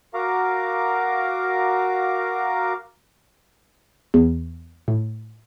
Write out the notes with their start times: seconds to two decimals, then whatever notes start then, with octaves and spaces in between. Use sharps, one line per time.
0.14 F#4 A#4 F5 A#5 D6
4.14 E2
4.88 A2